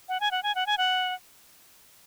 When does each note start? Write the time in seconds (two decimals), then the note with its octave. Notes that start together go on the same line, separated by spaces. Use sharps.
0.09 F#5
0.20 G#5
0.31 F#5
0.43 G#5
0.55 F#5
0.67 G#5
0.78 F#5